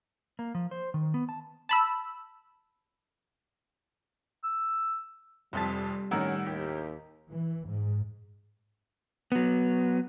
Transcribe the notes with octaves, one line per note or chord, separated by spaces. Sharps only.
A#3
F3
C5
D#3
B3
A5
A5 B5 E6
E6
F1 F2 C3 G3 A5 B6
A2 D#3 C#4 F#5
D#2 G4
E3
G#2
F#3 B3